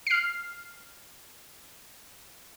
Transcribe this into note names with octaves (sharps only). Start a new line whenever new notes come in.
F6 C7